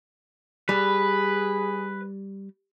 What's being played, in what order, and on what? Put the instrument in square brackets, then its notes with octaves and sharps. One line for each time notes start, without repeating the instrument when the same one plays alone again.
[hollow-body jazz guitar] G3 [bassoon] G#4 [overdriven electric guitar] B4